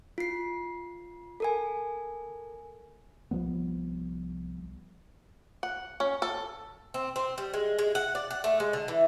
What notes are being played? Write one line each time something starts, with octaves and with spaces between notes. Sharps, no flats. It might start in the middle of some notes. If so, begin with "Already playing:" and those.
F4 C7
A4 A#4 G#5
C2 F3 G3 B3
F#5
C#4
A4
C4
C4
G3
G#3
G#3
F#5
D5
F#5
A3
G#3
D3
E3